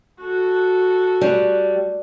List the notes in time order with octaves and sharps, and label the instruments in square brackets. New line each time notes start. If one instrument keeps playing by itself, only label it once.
[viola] F#4 A4
[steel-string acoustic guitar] G3